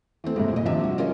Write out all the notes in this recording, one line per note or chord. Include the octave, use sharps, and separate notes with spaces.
E3 A3 C4
A2 C3 G#3
A#2 D#5
G#1 C3 F3 D4 E5
G3 F#4
C#4 F4 A#4 D#5